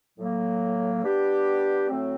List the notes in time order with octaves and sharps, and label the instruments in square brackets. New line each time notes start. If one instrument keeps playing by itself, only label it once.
[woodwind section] A2 F#3 A#3
G3 B3 D4 G4
A2 F#3 A3 C4